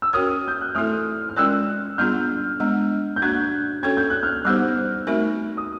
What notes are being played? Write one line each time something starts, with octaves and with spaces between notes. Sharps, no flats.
E6
C#4 F#4 A#4 C#5 D#6 F6
G6
F#6
A3 C4 E4 A4 D#6 F6
F6
G#3 C#4 F4 A#4 D5 E6 F#6
G3 B3 D4 F4 G#4 F6 G6
G#3 B3 D4
G6
A#3 D4 F#4 F#6 G#6
C#4 F#4 A4 C#5 G#6
G6
F#6
F6 G6
G3 B3 D#4 G4 C5 E6 F#6
A3 C4 D#4 F#4 A#4
D#6